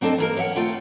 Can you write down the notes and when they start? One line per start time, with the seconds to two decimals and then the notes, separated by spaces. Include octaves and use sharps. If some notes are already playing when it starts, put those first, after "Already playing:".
0.01 F#3 C4 D4 A4 D#5
0.18 E3 A#3 A#4
0.37 C#5 D#5 E5 F#5 G5
0.56 D2 A3 F4 G5